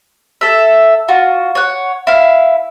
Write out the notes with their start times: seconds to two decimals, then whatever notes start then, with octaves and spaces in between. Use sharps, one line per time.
0.41 A4 E5
1.08 F4 F#4
1.55 C#5 F#5
2.07 E4 F5